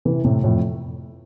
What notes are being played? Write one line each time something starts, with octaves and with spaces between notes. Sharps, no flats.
C3 E3
A2 C3
F2 A2